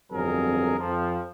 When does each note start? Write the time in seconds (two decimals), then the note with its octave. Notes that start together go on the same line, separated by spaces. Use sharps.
0.13 G1 F2 F#3 C4 G#4 A#4
0.80 F2 F3